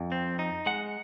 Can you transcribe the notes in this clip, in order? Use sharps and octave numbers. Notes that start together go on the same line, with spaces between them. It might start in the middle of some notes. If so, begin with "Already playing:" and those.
Already playing: F2
C4
D#4
G#3 F#5